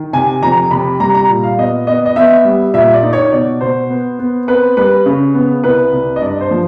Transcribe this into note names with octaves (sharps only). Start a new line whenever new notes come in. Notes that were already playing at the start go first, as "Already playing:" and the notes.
Already playing: D#3
C3 G#5
F2 A#5
C3 B5
G3 A#5
A#5
A#2
F5
B3 D#5
B3 D#5
D#5
B3 E5
G3
A#2 E5
D5
D#4
C#5
B2 D5
B2 C5
B3
B3
C4 B4
G3 B4
C#3
B3
C2 B4
C2
D#5
G2 D5
C5
F3